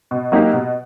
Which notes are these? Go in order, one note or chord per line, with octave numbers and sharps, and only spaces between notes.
B2
F#3 A#3 D#4 G4
B2